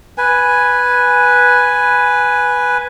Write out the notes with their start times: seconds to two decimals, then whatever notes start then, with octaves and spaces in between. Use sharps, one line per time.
0.18 B4 G#5